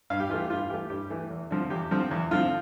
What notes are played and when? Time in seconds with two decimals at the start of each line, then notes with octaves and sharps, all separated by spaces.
0.10 G2 F5
0.20 G4
0.29 E3 F4
0.34 A3
0.40 G4
0.50 G2 F4
0.70 E3 A3 G4
0.90 G2 G4
1.10 E3 A3
1.30 E2
1.51 D3 F3 C4
1.70 E2 G4
1.91 D3 F3 C4
2.11 E2
2.31 D3 F3 C4 F4